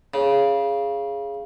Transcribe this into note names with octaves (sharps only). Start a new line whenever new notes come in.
C#3